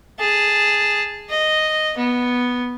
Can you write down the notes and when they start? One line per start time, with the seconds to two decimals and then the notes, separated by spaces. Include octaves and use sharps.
0.20 G#4 A5
1.30 D#5
1.98 B3